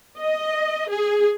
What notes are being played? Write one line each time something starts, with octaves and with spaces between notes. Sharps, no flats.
D#5
G#4